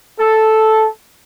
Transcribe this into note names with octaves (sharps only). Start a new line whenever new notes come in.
A4